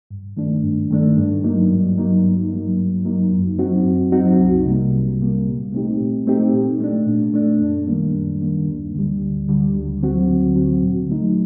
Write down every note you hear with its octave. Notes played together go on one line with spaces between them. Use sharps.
G2
D#3 A3 D4
G2
D#3 A3 D4
G2
F#3 A#3 D#4
G2
F#3 A#3 D#4
G2
F#3 A#3 D#4
G2
F#3 A#3 D#4
F#2
F#3 C4 D#4 F#4
F#2
F#3 C4 D#4 F#4
C2
C3 G3 A#3
C2
C3 G3 A#3
A#2
A3 C4 D#4 G4
A#2
A3 C4 D#4 G4
A#2
A3 D4
A#2
A3 D4
F#2
D#3 G3 A#3 D4
F#2
D#3 G3 A#3 D4
D2
D3 G3
D2
D3 G3
D2
D3 F#3 C4 F#4
D2
D3 F#3 C4 F#4
A#2
F#3 A3 D#4